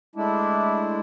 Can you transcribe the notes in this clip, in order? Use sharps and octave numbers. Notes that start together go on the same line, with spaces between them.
G#3 A3 D4 E4